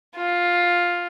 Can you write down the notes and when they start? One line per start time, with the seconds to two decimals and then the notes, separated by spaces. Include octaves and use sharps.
0.16 F4